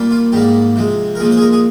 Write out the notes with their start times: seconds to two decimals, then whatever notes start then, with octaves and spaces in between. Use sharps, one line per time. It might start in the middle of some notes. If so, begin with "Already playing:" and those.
Already playing: A#2 G3 A#3
0.11 F4
0.32 G#2 G3 A#3 G4
0.76 C3 F3 G#3
1.15 A#4
1.20 A#2 F3 G#3 G#4
1.31 C5
1.37 G#4
1.42 A#4
1.53 G#4